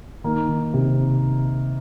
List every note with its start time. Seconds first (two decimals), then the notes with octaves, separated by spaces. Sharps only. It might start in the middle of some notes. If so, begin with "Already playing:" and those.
0.24 D#3 A#3
0.49 D#3
0.74 C3